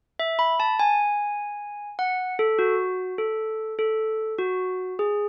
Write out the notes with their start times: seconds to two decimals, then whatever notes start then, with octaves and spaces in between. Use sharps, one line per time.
0.19 E5
0.39 B5
0.60 A5
0.79 G#5
1.99 F#5
2.39 A4
2.59 F#4
3.18 A4
3.79 A4
4.38 F#4
4.99 G#4